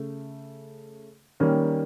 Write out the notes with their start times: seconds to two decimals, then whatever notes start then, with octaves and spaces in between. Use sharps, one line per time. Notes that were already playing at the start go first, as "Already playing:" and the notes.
Already playing: C#3 A3
1.40 D#3 G3 A#3 C#4